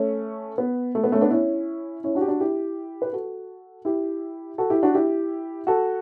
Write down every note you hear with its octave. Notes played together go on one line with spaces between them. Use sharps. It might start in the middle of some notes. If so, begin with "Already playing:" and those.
Already playing: A3 C#4
B3
A3
B3
A3 C#4
B3 D4
C#4 E4
C#4 E4
D4 F#4
G4
D4 F#4
E4 G4
B4
F#4 A4
E4 G4
F#4 A4
E4 G4
D4 F#4
E4 G4
F#4 A4